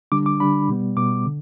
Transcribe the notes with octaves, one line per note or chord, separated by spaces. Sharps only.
D3 G3 D4 D6
D6
D3 G3 D4 B5
B2 G3 B3
B2 G3 B3 D6
D3